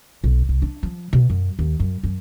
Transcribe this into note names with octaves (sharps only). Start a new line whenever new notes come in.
B1
C2
D4
F3
B2
F#2
D#2
F#2
F#2